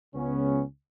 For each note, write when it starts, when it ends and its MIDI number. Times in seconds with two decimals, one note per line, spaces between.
0.15 0.62 37
0.15 0.62 49
0.15 0.62 59
0.15 0.62 61